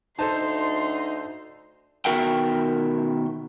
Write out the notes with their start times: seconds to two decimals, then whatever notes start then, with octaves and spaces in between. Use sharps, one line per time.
0.19 D2 D#4 A4 C5 A5 C6
2.05 B2 D#3 F#4 A#4 E5 G5